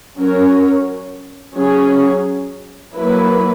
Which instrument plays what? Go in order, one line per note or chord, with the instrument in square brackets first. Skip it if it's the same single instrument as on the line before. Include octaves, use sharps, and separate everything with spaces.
[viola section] F#3 C#4 F#4 A#4 C#5
F#3 C#4 G#4 C#5
F#3 A#3 E4 B4